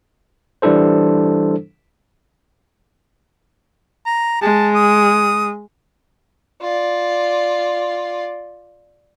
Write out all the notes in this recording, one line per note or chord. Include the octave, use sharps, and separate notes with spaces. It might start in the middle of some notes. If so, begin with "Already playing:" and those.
E3 G3 D4 E4 A4 C5
A#5
G#3 A5
D#6
F4 D5